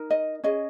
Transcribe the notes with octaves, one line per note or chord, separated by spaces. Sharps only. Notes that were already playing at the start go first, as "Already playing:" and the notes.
Already playing: D#4 A#4
D#5
C#4 G#4 D#5